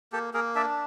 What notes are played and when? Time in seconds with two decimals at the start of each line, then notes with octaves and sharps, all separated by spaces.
0.12 A#3 G4 A4
0.34 A#3 G#4 A#4
0.55 D4 D5 E5